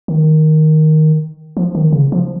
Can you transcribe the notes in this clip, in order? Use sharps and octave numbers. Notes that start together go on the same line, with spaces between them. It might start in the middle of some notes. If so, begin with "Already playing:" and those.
D#3
F3
D#3
C#3
F3